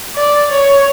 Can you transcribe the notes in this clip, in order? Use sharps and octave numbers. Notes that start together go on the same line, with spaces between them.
D5
C#5